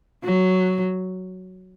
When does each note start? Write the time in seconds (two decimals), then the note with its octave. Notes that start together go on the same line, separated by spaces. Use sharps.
0.24 F#3